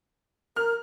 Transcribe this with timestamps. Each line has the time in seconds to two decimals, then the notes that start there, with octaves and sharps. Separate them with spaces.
0.56 A#4 F6